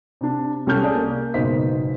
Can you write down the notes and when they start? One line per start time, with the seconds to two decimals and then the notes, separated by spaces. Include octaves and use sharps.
0.21 C3 D4
0.67 C2 G3 C#4 A4 F6 G6
0.82 G#4 A4 D5
0.95 A#3
1.34 F#1 G#2 B2 C5 D#5 B6